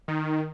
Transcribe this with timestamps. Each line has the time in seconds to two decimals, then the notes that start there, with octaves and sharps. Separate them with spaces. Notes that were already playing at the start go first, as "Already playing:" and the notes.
0.08 D#3